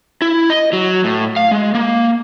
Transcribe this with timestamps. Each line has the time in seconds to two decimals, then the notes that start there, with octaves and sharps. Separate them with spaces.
0.22 E4
0.50 D#5
0.73 F#3
1.04 A2
1.36 F5
1.51 G#3
1.75 A#3